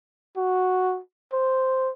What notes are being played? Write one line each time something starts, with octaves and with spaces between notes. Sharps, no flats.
F#4
C5